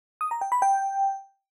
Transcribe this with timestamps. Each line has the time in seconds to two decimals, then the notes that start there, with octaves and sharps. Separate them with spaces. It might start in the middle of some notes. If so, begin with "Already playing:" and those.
0.21 D#6
0.31 A#5
0.41 G5
0.52 B5
0.62 G5